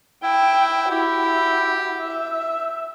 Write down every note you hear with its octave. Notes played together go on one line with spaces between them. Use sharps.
E4 G5
E4 F#4 G4
E5